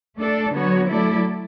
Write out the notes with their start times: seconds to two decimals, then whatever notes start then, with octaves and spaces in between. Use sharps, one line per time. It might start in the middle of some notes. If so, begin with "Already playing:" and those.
0.17 A3 D4 A4 D5
0.52 D3 F#3 B3 F#4 C#5
0.88 F#3 A3 E4 A4 D5